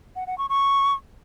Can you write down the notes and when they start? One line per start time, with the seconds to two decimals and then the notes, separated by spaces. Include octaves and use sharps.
0.16 F#5
0.27 F#5
0.38 C#6
0.49 C#6